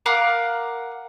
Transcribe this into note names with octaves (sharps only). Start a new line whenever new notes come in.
A#4 F5 F#5 D6